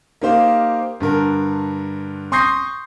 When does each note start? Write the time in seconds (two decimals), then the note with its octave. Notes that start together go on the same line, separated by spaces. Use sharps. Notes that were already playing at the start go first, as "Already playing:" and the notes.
0.21 A#3 D#4 G4 C5 F5
1.00 G2 D3 A#4
2.32 C6 C#6 D#6 G6 A#6 C7